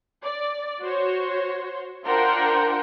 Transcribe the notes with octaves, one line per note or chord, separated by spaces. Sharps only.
D5
F#4 C5 C#5
D4 F4 A#4 C5 F#5 G5